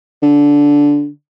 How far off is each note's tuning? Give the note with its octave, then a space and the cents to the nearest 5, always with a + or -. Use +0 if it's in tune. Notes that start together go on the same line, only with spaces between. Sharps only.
D3 -15